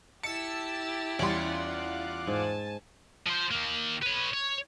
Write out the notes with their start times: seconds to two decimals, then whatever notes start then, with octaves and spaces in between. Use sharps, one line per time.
0.23 E4 G4 A5 E6 C#7
1.19 E2 G3 C#4 F4 D5 F#5 C6
2.27 G#2 G#5 A5
3.26 F3 C5
3.51 D#3 A#3
4.02 B4 C#5
4.33 C#5